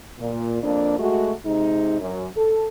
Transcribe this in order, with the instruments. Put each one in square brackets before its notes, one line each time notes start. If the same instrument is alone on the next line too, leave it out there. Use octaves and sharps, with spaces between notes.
[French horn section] A#2
F2 A#3 D4
G#3 A3 F#4
C3 G#3 D#4
F#2
A4